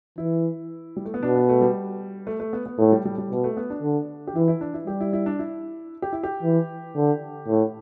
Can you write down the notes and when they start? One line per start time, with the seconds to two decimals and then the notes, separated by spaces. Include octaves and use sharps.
0.18 E3 E4
0.96 G3
1.05 A3
1.14 B3
1.23 B2 D4
1.35 B3
1.49 A3
1.61 G3
2.27 A3
2.40 A3
2.53 B3
2.66 B3
2.78 A2 A3
2.92 G3
3.05 G3
3.18 G3
3.31 B2
3.44 A3
3.57 B3
3.70 D4
3.82 D3
4.27 G4
4.35 E3 E4
4.48 E4
4.61 D4
4.74 E4
4.87 G3 G4
5.00 E4
5.13 E4
5.26 D4
5.39 E4
6.02 G4
6.13 E4
6.23 G4
6.43 E3
6.96 D3
7.48 A2